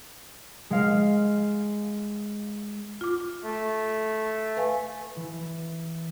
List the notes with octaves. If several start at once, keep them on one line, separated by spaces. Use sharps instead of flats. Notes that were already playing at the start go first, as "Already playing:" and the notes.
G#3 F5
F4 D6
A3
B4 F5 G#5
E3